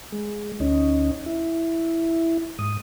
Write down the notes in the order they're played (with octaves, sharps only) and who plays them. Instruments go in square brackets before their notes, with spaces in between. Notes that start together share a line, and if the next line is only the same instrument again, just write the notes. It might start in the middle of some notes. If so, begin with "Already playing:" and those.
[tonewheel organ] G#3
D2 C#4 D#4
E4
G#2 D#6